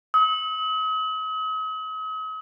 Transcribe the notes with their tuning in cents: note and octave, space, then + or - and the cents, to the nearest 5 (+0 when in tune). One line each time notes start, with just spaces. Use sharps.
D#6 +45